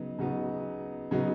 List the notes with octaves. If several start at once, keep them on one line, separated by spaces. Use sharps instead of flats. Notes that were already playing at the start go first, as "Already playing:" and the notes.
Already playing: C#3 F#3 B3 D#4
C#3 F#3 B3 D#4
C#3 F#3 B3 D#4